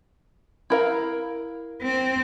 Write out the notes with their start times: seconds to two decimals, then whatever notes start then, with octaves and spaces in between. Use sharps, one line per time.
0.70 E4 A#4 F5
1.82 C4